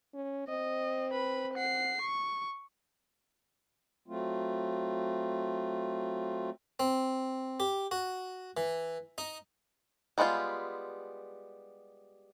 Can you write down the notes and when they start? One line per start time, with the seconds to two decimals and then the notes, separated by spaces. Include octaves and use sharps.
0.14 C#4
0.48 C4 D#5
1.13 B4 B5
1.54 F#5 C7
2.02 C#6
4.08 F#3 A3 C4 F4
6.80 C4
7.60 G4
7.91 F#4
8.57 E3
9.18 D#4
10.18 G3 G#3 B3 D4 F4